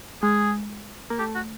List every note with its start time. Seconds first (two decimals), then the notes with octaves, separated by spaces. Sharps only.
0.22 G#3 G#4
1.10 A#3
1.19 A3 G4
1.35 F#4